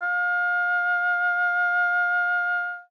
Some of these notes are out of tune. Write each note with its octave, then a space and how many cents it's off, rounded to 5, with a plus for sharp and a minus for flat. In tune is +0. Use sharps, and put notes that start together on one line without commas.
F5 +30